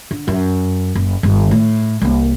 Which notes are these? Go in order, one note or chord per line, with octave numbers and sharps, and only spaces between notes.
D3
F#2
F#1
G1 D#3
A2
C2 A#3